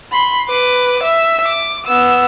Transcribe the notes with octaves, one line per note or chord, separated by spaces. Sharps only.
B5 C6
B4 D6
E5
D6
B3 E6